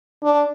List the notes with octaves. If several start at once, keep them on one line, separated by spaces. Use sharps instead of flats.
D4